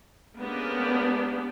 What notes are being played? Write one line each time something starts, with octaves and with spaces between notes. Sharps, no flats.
G#3 A#3 B3 C#4 D4 G4